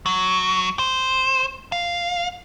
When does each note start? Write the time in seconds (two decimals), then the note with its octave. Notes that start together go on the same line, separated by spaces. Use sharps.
0.06 F#3
0.79 C5
1.72 F5